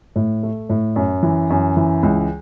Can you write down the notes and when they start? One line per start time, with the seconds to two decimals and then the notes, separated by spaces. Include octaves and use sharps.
0.16 A2
0.43 A3
0.69 A2
0.96 F#2
1.23 E3
1.50 F#2
1.77 E3
2.03 C#2